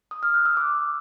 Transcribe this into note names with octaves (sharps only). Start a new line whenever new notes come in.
D#6
F6
F#6
E6
D6